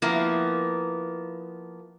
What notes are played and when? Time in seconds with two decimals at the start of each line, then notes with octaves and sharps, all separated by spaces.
0.02 F3 A#3 B3 E4